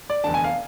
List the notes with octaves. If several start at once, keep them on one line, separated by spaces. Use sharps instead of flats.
D5
F1 E2 D3 A5
G#5
F5